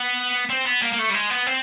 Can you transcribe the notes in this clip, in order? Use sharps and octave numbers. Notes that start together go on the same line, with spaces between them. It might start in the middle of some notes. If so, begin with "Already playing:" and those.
Already playing: B3
C4
B3
A#3
A#3
A3
G3
G#3
B3
C4